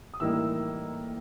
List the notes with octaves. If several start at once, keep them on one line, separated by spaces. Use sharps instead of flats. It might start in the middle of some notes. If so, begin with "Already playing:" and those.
D#6
A2 E3 G3 A#3 D#4 E6